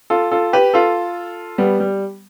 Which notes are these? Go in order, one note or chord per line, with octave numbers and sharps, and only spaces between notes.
F4 A4
F4 A4
G4 B4
F4 A4
G3 B3
G3